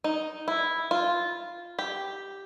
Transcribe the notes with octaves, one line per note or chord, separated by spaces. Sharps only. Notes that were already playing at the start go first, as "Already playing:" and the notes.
D#4
E4
F4
G4